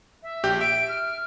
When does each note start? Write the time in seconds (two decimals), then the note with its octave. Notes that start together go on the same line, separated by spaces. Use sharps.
0.23 E5
0.43 A#1 G4 G6
0.61 E5 D7
0.89 F6